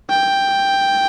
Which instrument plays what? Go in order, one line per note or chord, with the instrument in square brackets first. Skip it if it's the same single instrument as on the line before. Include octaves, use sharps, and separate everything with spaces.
[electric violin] G5